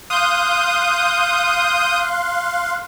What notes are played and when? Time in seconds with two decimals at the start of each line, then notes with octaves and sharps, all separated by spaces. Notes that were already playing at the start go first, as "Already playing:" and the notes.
0.10 F5 C6 D#6 F#6 G6